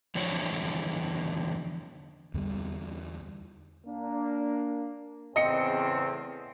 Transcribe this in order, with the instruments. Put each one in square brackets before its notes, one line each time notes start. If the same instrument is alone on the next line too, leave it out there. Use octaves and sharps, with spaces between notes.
[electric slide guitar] E2 D3 F3 C#5
[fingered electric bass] E2 D3 G3
[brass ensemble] A#3 D4
[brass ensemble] E2 A2 C#3 [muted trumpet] C4 [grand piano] D#5 C#7